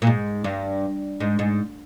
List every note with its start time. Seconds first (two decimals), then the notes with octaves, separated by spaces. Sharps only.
0.02 A#2
0.07 G#2
0.44 G2
1.20 G#2
1.39 G#2